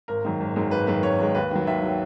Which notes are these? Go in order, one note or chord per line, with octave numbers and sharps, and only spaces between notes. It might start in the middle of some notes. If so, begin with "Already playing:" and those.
G#1 A#4
F#2 D#3 G#3
G#1
F#2 D#3 G#3
G#1 B4
F#2 D#3 G#3 B4
G#1 C#5
F#2 D#3 G#3
D#2 B4
D#3 F#3
D#2 E5
D#3 F#3